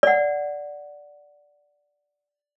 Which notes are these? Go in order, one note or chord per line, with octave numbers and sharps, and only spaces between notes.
D5 F#5